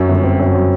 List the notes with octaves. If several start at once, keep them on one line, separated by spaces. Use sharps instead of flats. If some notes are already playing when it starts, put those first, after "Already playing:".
Already playing: F#2 F#3
G1
C4
F#2
F#3